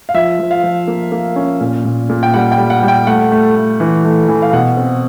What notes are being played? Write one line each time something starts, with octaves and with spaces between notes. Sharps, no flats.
F5
F3 E5
F3
F5
F3
A#3
A#3
C#4
A#2
A#2
A#2
G5
G3 F#5
G5
G3
F#5
G3
G5
A3 F#5
A3
A3
E3
A3
E3
F5
B2 F#5
C4